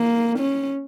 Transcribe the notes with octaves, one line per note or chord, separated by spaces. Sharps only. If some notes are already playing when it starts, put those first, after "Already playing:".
Already playing: A#3
C#4